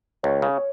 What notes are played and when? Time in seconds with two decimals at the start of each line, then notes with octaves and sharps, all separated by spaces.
0.23 C#2 C#5
0.42 C#3